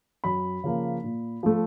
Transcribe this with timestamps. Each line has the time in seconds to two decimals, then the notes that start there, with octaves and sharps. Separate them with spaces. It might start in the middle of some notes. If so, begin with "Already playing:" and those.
0.24 F#2 B5
0.64 C#3 F3 A#3
1.03 A#2
1.43 F3 A3